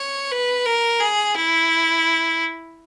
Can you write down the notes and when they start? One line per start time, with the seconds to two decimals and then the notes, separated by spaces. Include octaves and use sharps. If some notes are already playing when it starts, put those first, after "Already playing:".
Already playing: C#5
0.32 B4
0.66 A#4
1.00 G#4
1.35 E4